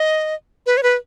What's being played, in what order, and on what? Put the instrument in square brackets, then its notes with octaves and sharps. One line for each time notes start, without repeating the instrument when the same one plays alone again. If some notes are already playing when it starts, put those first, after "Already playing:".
Already playing: [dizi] D#5
B4
C#5
B4